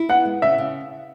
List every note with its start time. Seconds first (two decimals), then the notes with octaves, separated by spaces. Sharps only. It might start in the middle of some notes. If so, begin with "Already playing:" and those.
Already playing: E4
0.09 B3 F#5
0.25 G#3
0.42 C#3 E5
0.58 C#3